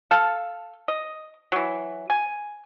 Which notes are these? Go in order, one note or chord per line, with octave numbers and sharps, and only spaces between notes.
A4 F5
D#5
E3 F#3
G#5